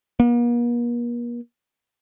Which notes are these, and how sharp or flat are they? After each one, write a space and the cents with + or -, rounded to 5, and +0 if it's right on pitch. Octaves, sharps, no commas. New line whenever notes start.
A#3 +45